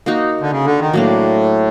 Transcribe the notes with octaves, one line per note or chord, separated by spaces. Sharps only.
A#3 D#4 F#4
D3
C#3
D3
D#3
A2 F#3 A#3 D4